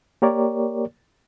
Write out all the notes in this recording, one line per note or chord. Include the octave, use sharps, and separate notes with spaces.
A#3 G4 A#4 C#5 D5